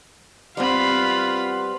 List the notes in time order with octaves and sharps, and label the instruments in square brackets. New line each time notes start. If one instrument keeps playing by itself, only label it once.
[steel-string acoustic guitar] G3 B3 C4 [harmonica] F4 F#5 [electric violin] F5 B5